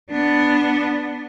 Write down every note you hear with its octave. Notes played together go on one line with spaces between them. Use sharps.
B3 D4